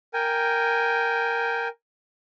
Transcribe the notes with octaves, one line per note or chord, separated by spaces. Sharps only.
A#4 G5 G#5